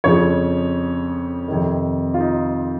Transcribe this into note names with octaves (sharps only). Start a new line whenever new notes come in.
F2 C#3 F3 C#5
F2 C3 D#3
F4
D#4